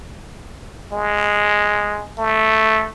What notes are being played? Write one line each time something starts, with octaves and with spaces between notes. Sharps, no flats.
G#3
A3